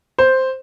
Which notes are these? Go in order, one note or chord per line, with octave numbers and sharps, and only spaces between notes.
C5